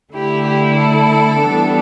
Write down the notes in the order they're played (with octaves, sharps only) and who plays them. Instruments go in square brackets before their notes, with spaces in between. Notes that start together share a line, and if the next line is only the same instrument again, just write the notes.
[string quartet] D3 A3 E4 G4
G4
A4
E3 G3 B3 D4